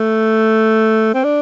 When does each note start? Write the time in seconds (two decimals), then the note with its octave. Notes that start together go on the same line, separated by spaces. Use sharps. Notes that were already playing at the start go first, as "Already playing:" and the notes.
Already playing: A3
1.14 C4
1.24 D4